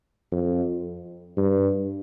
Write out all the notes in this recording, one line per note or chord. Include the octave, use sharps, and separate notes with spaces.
F2
G2